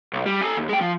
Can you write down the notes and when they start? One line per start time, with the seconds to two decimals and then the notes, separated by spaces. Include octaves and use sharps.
0.13 B1
0.26 G3
0.41 A4 G#5
0.57 D#2
0.69 G#3 G5
0.81 F3